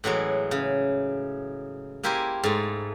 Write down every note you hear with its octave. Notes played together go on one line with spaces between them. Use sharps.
A2 E3 F#3 G#3
C#3
A#3 E4 G4 A#4 C5 G#5
G#2 A3